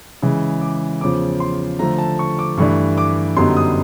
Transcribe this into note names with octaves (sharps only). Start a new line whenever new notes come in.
C#3 E3 G#3
D6
E2 C#3 F3 D6
C6
D3 F3 A3 A#5
A5
C#6
D6
G2 E3 A3 D4 C#6
D6
F#2 D3 G3 B3 D#4 C6
D#6